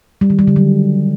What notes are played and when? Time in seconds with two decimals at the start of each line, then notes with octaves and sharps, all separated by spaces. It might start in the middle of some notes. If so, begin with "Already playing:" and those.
0.21 G3
0.30 D#3
0.39 G3
0.47 D3
0.56 F#3